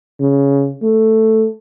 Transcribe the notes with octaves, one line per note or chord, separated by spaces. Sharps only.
C#3
A3